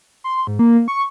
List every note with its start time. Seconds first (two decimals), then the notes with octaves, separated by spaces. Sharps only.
0.24 C6
0.47 G#2
0.59 A#3
0.88 C#6